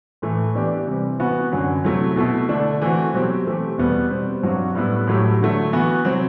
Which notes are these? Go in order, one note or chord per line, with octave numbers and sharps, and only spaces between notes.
A2 E3 A3
E3 B3 D4 G4
C3 E3 G3 C4
C3 E3 B3 F#4
F#2 D3 F#3
C3 F#3 A3 E4
B2 A3 E4
D3 A3 D4
E3 A3 C4 F#4
B2 F#3 C4 G4
E3 A3 C4 G4
E2 B2 G3 B3
B2 G3 C4
G2 F#3 C4 F#4
A2 G3 B3 E4
A2 F#3 A3 E4 G4
D3 F#3 A3
E3 B3 F#4
C3 F#3 C4